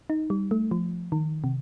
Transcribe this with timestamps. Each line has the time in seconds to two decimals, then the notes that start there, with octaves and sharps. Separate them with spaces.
0.10 D#4
0.30 G3
0.51 A3
0.71 F3
1.12 D#3
1.44 C3